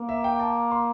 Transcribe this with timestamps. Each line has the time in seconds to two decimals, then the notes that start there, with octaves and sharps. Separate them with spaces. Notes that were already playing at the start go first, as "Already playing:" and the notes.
Already playing: A#3
0.09 E5
0.24 G5
0.40 A5
0.71 C6